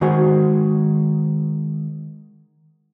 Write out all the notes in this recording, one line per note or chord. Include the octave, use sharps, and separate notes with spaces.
D#3 G#3 F#4 C5 G#5